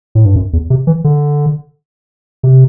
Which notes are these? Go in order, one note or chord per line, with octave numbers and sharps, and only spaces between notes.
A2
G2
F#2
E2
C3
E3
D3
C3